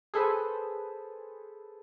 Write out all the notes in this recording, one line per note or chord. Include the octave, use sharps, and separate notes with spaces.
G#4 A4 B4 C5